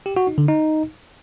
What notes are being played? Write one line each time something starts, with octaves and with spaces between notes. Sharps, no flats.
G4
F#4
D#4
D3
D#4